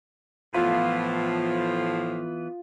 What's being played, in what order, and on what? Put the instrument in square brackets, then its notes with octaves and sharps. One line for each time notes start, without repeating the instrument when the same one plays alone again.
[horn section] A2 F3 [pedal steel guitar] E3 B3 B4 [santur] F4